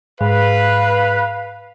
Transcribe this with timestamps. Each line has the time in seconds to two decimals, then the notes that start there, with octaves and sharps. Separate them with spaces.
0.21 G#2 B4 F5